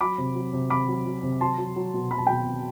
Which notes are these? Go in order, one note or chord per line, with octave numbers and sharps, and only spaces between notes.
F#3 B5 D6
C3
F#3
C3
C3 B5 D6
F#3
F#3
C3
F#3 A5 C6
F#3
F#3
B2
F#3 B5
A5
B2 G5 B5
B2